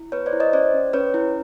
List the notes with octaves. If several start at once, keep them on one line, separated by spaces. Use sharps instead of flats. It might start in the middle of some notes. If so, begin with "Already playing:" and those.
Already playing: E4
B3 B4 C#5
C5 D5
E4
C#5 D#5
C#4 C5 D5
C#4
C#4 B4 C#5
E4